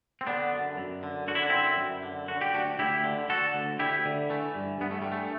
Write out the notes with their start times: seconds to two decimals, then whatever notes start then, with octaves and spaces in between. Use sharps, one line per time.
0.21 C4
0.27 D3 B3 D4
0.52 F#2
0.77 F#2
1.03 D3
1.28 D3 F#4
1.35 E4
1.42 D4
1.50 F#2 C4 E4
1.78 F#2
2.03 D3
2.28 D3 F#4
2.41 G4
2.54 D2 D4 F#4
2.79 D2 E4 G4
3.04 D3
3.29 D3 F#4 A4
3.54 D2
3.79 D2 E4 G4
4.05 D3
4.29 E3 A3
4.55 G2
4.81 G2 B3
4.91 A3
5.02 E3 G3
5.12 A3